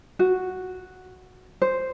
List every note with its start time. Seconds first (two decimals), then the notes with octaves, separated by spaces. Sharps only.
0.19 F#4
1.62 C5